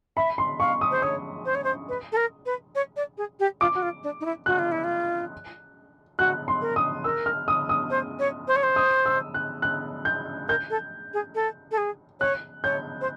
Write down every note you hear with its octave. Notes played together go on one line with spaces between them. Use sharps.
E5 B5
C6
F5 C#6
D#6
C5
C#5 D#6
C5
C#5
C5
B4
A4
A#4
B4
C#5
D5
G#4
G4
F4 D6
F#4
F4
D4
D#4
E4
F#4 F#6
F4
E4
F4
F#4 F#6
C6
A#4
D#6
A#4 E6
F6
D#6
D#6
C5
C#5
C5
C#5
C5
D#6
E6
F#6
F#6
G6
A#4 G6
A4
G#4
A4
A4
G#4
C#5 F#6
C#5 G6
C5